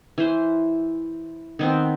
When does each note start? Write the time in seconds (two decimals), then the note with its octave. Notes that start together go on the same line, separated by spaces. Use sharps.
0.18 E3 C5
1.59 D#3 B3 C4